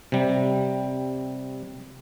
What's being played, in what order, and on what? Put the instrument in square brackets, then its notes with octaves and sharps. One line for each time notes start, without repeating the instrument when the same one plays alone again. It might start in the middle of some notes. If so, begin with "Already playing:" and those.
[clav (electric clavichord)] C3 G3